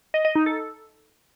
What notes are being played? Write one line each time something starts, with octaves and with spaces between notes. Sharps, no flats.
D#5
D#5
D#4
A4